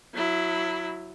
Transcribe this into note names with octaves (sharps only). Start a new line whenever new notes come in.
F#3 E4